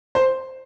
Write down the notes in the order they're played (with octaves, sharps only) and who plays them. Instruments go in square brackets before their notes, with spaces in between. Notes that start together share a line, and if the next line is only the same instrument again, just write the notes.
[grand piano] C5